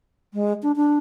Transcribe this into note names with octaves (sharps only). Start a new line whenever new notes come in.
G#3
D4
D4